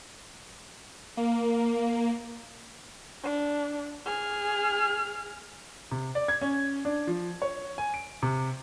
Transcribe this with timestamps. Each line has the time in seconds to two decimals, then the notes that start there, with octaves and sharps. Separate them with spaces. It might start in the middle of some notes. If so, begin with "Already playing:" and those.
1.17 A#3
3.24 D4
4.06 G#4 F6
5.91 C3
6.15 D5
6.28 G#6
6.41 C#4
6.85 D4
7.07 F3
7.42 C#5
7.78 G#5
7.94 D7
8.22 C3